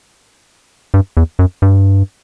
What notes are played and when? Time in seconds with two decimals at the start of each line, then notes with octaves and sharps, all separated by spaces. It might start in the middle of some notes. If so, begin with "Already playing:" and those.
0.94 G2
1.17 E2
1.39 F#2
1.62 G2